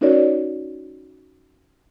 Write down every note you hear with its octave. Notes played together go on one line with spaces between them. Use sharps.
C#4 D#4 F#4 A#4 C#5 D5